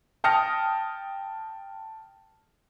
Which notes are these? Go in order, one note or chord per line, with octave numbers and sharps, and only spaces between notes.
G5 A5 D#6 F6 A#6 C#7